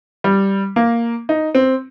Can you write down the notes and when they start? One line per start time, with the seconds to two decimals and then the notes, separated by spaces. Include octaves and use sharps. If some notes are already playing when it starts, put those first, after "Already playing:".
0.24 G3
0.76 A#3
1.29 D#4
1.55 C4